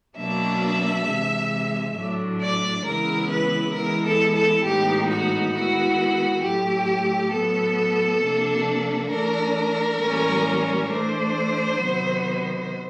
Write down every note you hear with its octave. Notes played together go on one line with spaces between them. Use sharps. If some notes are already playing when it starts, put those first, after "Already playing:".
B2 F#3 A#3 D4 E5
C3 E3 G#3
A2 F#3 A3 D4
D5
C#3 E3 G#3 B3 E4 A#4
B4
E3 G#3 B3 E4 A#4
A4
A4
A2 E3 G#3 B3 D#4 G4
F#4
D#3 G#3 B3 E4 F#4
A2 F#3 A3 G4
A2 F#3 B3 A4
C3 F3 A#3 D4
E3 A3 D4 A#4
A2 E3 G3 A#3 C#4
E3 A3 D4 C5
C3 D#3 F#3 B3